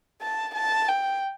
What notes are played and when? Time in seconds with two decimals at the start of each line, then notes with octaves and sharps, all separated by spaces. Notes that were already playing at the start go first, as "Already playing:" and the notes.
0.22 A5
0.55 A5
0.88 G5